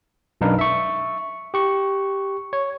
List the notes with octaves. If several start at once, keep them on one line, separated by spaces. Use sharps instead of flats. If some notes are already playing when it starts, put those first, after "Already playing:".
B1 F#2 D4 D#4 B4 F5
E5 C#6
G4 C#6
C#5